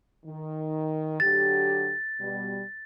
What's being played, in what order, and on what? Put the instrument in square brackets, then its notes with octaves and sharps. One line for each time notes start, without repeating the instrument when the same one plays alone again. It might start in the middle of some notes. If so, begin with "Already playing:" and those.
[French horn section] D#3
[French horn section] D3 F#3 G4 [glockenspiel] A6
[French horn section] B2 G3